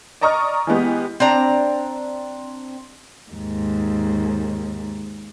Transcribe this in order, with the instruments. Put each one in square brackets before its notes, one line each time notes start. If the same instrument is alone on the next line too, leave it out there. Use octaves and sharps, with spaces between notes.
[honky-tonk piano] D5 D#5 A#5 C#6 D#6 F6
E3 G#3 B3 G4
[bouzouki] C4 D4 A#5
[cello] D#2 G#2